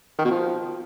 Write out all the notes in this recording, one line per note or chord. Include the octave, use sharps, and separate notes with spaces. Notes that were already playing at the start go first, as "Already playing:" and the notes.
D#3
B2
F3